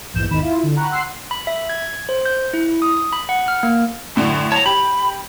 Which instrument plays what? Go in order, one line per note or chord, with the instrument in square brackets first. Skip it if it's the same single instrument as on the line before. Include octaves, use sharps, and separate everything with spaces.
[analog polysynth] A#1 E2 G#2 G6 E7
G#1 E2 G#2 D#3 B5 E7
E4 F4
D3
F#5 G5 A#5 B5 C#6 F#6
F#5 C6 E6 F#6 C7
[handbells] B5
E5
G#6
C5
G6
E4
D#6
B5
F#5
F6
A#3
[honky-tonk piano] F#2 A2 D3
[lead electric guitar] C#5 A#5 [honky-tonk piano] A5
[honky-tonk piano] G4 [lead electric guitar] B5